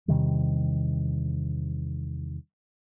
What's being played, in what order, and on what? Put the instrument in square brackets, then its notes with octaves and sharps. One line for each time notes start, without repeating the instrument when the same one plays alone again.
[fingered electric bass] E2 C3 D#3 G3